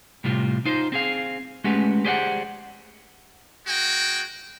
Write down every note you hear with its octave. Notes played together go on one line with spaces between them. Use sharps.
A2 C3 G3 F4
D#4 F4 C5
C4 G#4 F5
G#3 A3 C#4 F#4 G4 B4
G4 G#4 C5 D5 E5 F#5
G#3 F#4 G5